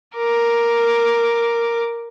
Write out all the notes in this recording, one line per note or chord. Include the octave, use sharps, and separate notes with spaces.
A#4 D6